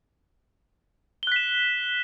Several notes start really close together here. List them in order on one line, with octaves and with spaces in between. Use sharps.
G7 F#6 B6 E7